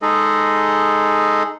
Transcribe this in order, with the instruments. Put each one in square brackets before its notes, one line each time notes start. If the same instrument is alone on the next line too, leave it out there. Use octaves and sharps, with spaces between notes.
[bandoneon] G#3 D#4 G#4 A4 D#5